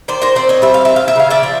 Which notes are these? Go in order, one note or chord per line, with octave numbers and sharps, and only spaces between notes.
D#3 C5 D5
A#4 C5
C4 C5 D5
C#5 D#5
G3 E5
F5
D#3 E5
F5
E5
C#3 F5
D5 E5
F3